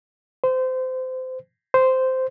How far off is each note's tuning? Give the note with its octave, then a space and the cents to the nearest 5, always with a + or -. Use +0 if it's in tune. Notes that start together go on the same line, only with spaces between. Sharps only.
C5 -25
C5 -10